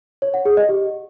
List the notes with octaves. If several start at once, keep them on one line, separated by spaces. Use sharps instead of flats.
C#5
F#5
G#4
D#5
G4